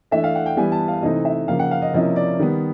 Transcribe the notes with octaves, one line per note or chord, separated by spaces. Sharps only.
E3 A3 D4 E5
F5
F#5
G5
E3 G3 B3 G#5
A5
F5
C3 E3 A3 C4 D#4 D#5
E5
C#3 F3 A#3 F5
F#5
F5
D#5
C3 F3 A#3 C#4 E4 D#5
D5
D#3 G3 B3